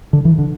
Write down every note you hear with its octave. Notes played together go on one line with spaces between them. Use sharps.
D3
E3
D3